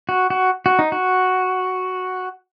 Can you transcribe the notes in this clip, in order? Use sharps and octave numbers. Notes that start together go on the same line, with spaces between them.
F#4
F#4
F#4
D#4
F#4